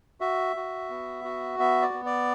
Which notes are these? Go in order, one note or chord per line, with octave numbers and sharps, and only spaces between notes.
F#4 E5
F#4
B3
F#4
B3 E5
D5
B3
D5